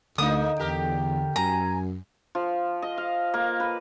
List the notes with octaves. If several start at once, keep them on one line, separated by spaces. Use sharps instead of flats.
D2 D3 A#3 D#4 D#6
E2 G4 A#4
F#2 G#5 A#5
F3
D#5
F5
A#3
B4